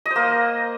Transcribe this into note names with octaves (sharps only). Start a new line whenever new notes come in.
D#5
C5
A#3